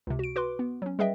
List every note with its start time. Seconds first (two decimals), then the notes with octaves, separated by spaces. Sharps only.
0.07 C#2 C3
0.19 F#4 D7
0.36 F#4 B4 C6 D6
0.59 B3
0.82 F#3 C#4
0.99 G3 G#4 B4 D#5 E5 G5